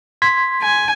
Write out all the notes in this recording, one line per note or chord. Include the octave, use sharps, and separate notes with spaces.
C6 G#6 B6
G#5